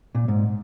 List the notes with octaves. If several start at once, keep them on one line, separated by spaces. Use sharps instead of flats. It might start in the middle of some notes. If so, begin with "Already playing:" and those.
A#2
G#2